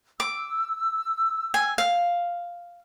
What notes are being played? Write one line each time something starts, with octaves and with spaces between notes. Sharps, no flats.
D6 E6
G#5
F5